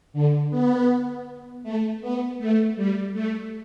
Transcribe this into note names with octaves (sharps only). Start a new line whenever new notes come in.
D3
B3
A3
B3
A3
G3
A3